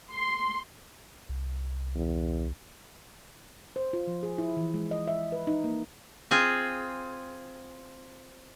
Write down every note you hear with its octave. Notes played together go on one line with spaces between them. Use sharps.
C6
C2
E2
C5
F4
F3
G#4
E4
E3
G#3
D#5
E5
B4
D#4
A#3
C4 F4 G#4